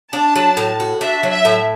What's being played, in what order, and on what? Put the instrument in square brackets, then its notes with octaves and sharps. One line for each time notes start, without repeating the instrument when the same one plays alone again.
[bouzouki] D4 [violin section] A5
[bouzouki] F#3
A2
F#4
[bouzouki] D4 [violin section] E5
[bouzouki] F#3
[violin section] E5
[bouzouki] A2